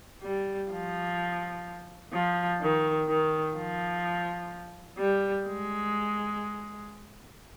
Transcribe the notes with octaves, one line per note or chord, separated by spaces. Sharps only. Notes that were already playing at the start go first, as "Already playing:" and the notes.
G3
F3
F3
D#3
D#3
F3
G3
G#3